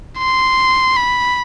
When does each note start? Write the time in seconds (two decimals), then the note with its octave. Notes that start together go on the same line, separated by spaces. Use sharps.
0.18 C6
0.96 B5